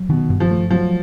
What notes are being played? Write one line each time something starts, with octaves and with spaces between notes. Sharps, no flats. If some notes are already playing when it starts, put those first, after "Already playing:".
Already playing: F#3
B2 D#3
G2
F3
A3
F3 F#3